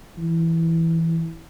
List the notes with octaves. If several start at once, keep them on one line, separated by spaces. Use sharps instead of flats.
E3